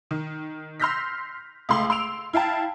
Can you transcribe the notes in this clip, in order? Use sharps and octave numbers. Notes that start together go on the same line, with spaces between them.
D#3
C6 E6 F6 G6 A#6 B6
C#2 A3 C6 F#7
C6 E6 D7 F7
E4 F5 G5 A5